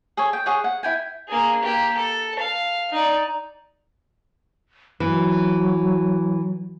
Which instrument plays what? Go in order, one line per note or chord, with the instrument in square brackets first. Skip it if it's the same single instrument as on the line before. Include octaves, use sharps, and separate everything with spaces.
[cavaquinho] G#4 A4 C#5
G5
G#4 C#5 F#5
F#5
E4 G5 G#5
[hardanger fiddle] A#3 G#4
A#3 G4
A4
F5
D#4 D5
[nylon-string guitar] E3 [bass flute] F#3